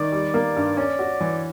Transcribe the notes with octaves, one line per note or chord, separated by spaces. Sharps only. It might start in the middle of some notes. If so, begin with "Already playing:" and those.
Already playing: D#3 D5
G3
A#3
G2
C#4 D5
F#4
E3